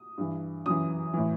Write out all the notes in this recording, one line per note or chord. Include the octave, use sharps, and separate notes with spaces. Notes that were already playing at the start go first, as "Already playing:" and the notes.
Already playing: D#6
G2 E3
F#2 E3 D#6
A2 E3